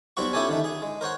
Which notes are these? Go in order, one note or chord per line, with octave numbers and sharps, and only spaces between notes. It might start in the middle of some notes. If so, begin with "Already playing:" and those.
B1 F#3 G3 C4 F#4 C#6
C#4 E4 G4 A4 C#5 G#5
D3 D#3 A3
G#4
G#3
A#4 C5 C#5 F#5